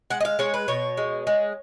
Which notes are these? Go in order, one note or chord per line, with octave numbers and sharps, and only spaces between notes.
G#3 F#5
D#5
F5
G#3 C#5
B4
B2 C#5
G#3
G#3